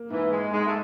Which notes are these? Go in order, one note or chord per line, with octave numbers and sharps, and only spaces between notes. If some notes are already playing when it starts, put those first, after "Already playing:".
Already playing: A#3
G#2 E3
G#3
G#2 G#3
A3